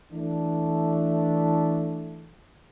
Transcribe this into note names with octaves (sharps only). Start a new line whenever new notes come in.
E3 A3 D4